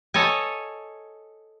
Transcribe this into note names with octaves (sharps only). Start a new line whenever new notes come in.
A4 C#5 D#5 G#5